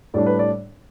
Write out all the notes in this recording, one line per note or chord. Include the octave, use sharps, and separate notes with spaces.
A2 G3 D4 D5
B4
D5